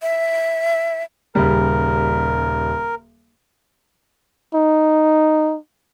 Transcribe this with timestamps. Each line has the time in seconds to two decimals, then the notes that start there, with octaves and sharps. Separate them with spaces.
0.02 E5
1.35 D#1 C#3 G3 A#4
4.54 D#4